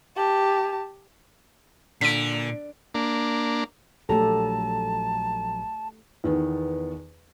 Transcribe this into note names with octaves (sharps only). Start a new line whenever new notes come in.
G4 A5
A#2 D3 B6 D7
A#3 D4
A#1 F#3 A3 G4 A4 A5 A#5
E2 D#3 B3